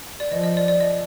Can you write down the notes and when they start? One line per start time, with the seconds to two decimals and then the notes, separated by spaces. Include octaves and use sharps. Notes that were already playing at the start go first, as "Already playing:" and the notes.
0.20 D5
0.32 F3 D#5
0.43 D#5
0.57 D5
0.68 D5
0.80 D#5